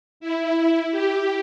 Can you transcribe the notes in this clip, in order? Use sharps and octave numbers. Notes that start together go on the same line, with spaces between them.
E4
G4